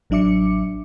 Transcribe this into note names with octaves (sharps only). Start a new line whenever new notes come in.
A1 F#3 D4 E5 D6 C#7